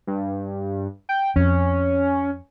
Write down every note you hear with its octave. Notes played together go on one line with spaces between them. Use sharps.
G2
G5
F2 C#4